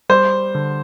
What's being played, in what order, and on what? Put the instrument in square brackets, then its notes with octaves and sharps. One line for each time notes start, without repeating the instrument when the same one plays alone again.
[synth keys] G3 [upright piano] C5
[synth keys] D3